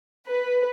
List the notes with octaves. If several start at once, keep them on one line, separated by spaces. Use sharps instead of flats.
B4